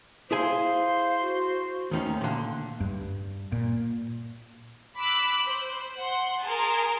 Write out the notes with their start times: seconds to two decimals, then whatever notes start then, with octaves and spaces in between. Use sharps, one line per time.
0.31 E4 G#4 C5 F5 G#5
1.21 F#4
1.91 D#2 D#3 A3 C#4
2.21 A#2 D3
2.80 G2
3.52 A#2
4.96 B5 D6 E6 F#6
5.45 C5
5.96 F#5 C6
6.40 G#4 A#4 G#5 A5 C6